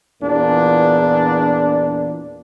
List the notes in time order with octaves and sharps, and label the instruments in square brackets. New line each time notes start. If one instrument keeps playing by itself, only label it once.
[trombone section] E2 A#2 D4